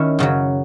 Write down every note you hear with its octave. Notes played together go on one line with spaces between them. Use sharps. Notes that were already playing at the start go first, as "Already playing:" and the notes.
Already playing: D#3 C#4 E4
F#2 C#3 F#3